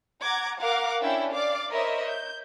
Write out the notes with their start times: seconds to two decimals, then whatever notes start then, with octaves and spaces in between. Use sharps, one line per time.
0.23 F#5 A#5 D6 G#6
0.59 A#4 F5 F#5 D6
1.01 C#4 D4 E4 E5 G5
1.34 D5 F5 D6
1.72 A#4 C5 C#5 D#5 E5 B5
2.07 G6